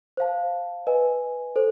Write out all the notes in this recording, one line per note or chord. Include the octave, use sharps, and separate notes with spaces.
C5 F5 A5
B4 D#5 G#5
A4 C5